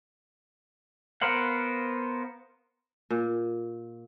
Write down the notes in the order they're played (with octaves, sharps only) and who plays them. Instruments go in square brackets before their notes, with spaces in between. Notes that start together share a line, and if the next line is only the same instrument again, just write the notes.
[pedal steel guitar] B3 A#4 C5 F5 F#5
[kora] A#2